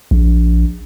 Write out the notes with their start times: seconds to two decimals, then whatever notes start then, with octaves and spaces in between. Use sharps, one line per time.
0.11 A#1